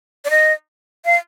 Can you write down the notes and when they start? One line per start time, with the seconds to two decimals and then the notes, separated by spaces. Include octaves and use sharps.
0.25 D5
0.30 D#5
1.05 F5